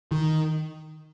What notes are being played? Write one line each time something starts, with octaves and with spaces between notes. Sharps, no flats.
D#3